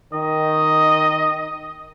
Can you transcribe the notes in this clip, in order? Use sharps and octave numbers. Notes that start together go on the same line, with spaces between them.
D#3 D#5